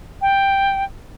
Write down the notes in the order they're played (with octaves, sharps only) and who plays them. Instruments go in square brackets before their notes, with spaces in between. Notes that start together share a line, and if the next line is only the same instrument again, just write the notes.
[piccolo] G5